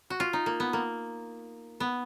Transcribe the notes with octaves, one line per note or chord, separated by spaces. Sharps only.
F#4
F4
D#4
A#3
B3
A#3
B3